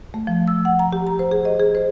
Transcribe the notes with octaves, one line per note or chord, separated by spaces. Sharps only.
A3
F3
E6
F#5
A#5
G4
A#5
C5
G#4
D#5
G#4
C5